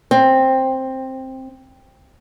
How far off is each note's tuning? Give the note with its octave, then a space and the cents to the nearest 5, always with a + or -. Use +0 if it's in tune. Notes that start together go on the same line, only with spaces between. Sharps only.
C4 +10